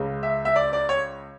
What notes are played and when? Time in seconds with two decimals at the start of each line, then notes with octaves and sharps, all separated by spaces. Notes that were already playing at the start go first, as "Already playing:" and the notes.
Already playing: C#2 C#3 G#3
0.23 E5
0.45 E5
0.56 D5
0.73 D5
0.89 C#5